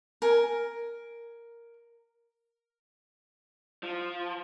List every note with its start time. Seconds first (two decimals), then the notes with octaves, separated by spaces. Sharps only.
0.22 A#4 G#5
3.83 F3